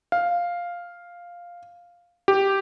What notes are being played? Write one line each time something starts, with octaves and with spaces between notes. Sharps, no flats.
F5
G4